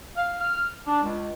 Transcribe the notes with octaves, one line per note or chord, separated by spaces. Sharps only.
F5
F6
D4
C#2